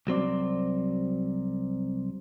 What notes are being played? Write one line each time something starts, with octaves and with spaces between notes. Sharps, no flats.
C2 F#3 C4 D5